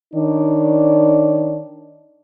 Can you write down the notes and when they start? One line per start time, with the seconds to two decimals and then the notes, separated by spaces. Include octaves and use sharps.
0.14 D#3 D4 D#4 C#5 D5